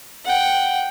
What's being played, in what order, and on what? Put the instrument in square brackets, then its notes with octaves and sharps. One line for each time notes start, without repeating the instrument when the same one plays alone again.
[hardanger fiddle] F#5 G5